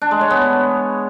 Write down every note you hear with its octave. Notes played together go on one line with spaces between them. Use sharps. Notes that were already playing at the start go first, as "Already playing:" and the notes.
D4
G#3
C#5
B3